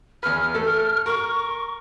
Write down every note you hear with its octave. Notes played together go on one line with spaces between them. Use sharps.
E2 B4 F6
A3 A4
A#4 C#6